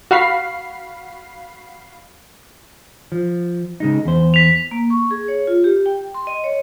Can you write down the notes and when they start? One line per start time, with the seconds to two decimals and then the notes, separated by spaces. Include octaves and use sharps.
0.11 F#4 F5 B5 C7
3.12 F3
3.80 C#3 G#3 D#4
4.05 E2 C5
4.34 B6 F7
4.71 A#3
4.90 C#6
5.11 G#4
5.28 C#5
5.47 F4
5.64 G4
5.86 G5
6.14 C6
6.27 D#5
6.44 C#5